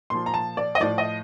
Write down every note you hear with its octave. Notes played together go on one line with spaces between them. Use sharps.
A#2 F3 C6
A#5
A5
D5
D#5
A2 F3 D5
D#5